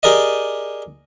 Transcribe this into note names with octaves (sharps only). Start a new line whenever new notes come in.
G4 G#4 A#4 D5 D#5